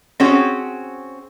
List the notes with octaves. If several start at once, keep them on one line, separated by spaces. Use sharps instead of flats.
C4 C#4 F#4 G#4